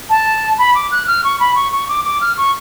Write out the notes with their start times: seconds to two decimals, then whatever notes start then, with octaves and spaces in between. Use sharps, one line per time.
0.10 A5
0.59 B5
0.75 D6
0.92 F#6
1.07 F6
1.24 C#6
1.40 B5
1.55 C#6
1.72 C#6
1.89 D6
2.04 D6
2.21 F6
2.37 C#6